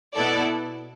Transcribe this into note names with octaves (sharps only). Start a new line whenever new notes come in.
B2 B3 E4 A4 D5